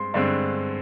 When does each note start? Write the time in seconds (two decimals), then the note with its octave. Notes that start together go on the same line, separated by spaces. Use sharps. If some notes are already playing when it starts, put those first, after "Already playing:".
Already playing: G2 G#3 C4 C6
0.14 G2 D3 G#3 C4 D5